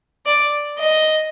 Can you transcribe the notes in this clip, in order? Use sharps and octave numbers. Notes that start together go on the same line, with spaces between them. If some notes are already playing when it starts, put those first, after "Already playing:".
D5
D#5